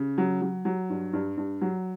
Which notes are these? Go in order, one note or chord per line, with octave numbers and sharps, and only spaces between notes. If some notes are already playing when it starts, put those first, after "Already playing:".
Already playing: C#3
F#3
F#3
F#3
G2
G2
G2
F#3